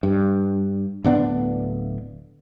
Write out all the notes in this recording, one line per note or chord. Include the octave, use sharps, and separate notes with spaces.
G2
D1 D3 B3 D4